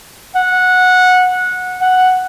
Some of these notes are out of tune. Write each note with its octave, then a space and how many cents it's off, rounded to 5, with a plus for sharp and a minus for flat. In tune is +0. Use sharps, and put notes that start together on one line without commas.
F#5 -15
F#5 +0